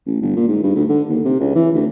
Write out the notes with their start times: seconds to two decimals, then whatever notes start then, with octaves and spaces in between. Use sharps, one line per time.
0.06 A1
0.21 G1
0.36 A#2
0.48 G#2
0.63 G2
0.75 D2
0.89 D3
1.09 D#2
1.25 C3
1.40 C#2
1.55 E3
1.74 D2